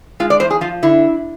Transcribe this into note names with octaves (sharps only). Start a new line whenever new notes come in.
G#3 F4
D5
E2 C5
G#4
F3 F4
D3 E4